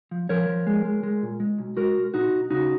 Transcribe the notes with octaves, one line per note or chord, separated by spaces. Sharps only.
F3
F3 A#4 C#5
F3
G#3
G#3
G#3
A#2
G#3
B1
G#3 F#4 A#4
B1
A#2 D#4 F#4
B1
C#3 D#4 F#4